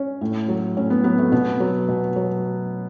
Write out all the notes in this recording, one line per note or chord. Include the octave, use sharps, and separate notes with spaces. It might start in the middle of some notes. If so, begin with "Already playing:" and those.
Already playing: C#4
A2
F#3
A2 C#4
B3
F#3 B3
A3
B2 B3
F#3
B2
F#3